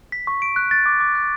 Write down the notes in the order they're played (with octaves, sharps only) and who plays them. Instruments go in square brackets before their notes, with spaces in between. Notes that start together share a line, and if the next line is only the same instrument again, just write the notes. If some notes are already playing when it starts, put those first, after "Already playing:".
[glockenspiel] B6
C#6
D7
F#6
A6
D6
D6
F#6